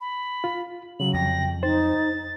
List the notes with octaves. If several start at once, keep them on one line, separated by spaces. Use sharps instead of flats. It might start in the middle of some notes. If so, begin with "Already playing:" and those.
B5
F4
C#3 F#3 F#7
F2 G5 A#6
D#4 C5 A6